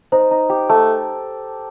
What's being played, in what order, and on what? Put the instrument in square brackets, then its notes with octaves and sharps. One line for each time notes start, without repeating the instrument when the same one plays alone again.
[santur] D#4 [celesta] C5
[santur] D#4
G4
A3